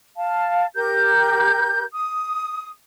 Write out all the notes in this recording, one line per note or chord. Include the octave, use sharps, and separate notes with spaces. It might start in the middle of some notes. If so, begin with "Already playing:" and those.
F5 A5
G4 A#4 G6
D#6